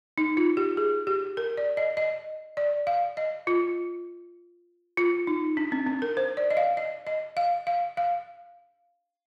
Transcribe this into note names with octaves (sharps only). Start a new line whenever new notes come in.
D#4
F4
G4
G#4
G4
A#4
D5
D#5
D#5
D5
F5
D#5
F4
F4
D#4
D4
C4
C4
A#4
C5
D5
D#5
F5
D#5
D#5
F5
F5
F5